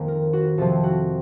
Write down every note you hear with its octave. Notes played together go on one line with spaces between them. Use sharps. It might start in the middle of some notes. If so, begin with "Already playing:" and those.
Already playing: F2 D#3 A#3 C5
A#4
F#4
F2 C3 F3 C4 A4
F#4